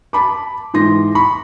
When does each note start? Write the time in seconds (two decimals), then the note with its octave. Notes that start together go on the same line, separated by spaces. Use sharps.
0.13 A5 B5 D6
0.74 G#2 E3 C6 A#6
1.15 B5 C#6